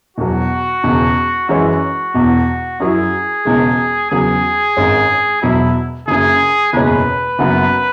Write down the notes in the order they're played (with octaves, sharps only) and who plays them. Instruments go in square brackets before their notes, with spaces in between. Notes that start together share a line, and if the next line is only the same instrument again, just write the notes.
[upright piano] E1 E2 B2 F#3 [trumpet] F#4
[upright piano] E1 E2 C#3
[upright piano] F#2 E3 G#3 C#4 E4 [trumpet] F#4
[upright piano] E1 E2 B2
[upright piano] F#2 F#3 E4 [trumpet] G#4
[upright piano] E1 E2 C#3 G#3
[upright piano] E2 C#3 F#3 [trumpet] G#4
[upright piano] G#1 G#2 G#3 C#4
[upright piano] E1 E2 B2 F#3 [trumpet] E4
[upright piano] F#1 F#2 C#3 [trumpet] G#4
[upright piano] F#1 E2 B2 G#3 C#4 [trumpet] B4
[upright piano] F#1 F#2 F#3 B3